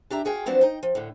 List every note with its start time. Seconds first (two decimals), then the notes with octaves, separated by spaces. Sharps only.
0.10 D4 G4 E5 A#5
0.25 F#4 G#4 F5 G5
0.46 F3 F#3 B3 C4 D4
0.61 D#4 G5
0.83 F3
0.95 A2 D3